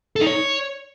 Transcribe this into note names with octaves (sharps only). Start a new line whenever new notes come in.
A4
D#4
C#5